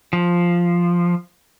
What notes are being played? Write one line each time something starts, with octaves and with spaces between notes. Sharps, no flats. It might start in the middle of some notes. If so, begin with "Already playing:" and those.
F3